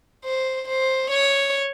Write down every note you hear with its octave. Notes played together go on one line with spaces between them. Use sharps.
C5
C5
C#5